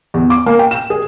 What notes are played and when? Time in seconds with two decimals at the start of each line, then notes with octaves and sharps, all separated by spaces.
0.14 E2
0.30 D6
0.46 A#3
0.59 G5
0.71 E7
0.90 G#4